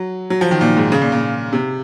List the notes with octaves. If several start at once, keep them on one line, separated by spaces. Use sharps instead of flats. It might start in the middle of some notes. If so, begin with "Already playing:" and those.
Already playing: F#3
F#3
F3
D#3
A#2
G#2
C#3
A#2
A#2
C3